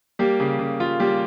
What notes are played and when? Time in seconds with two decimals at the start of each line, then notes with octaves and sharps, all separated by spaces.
0.19 G3 A#3 G4
0.40 C#3
0.59 C#3
0.80 G3 F4
1.00 G3 A#3 G4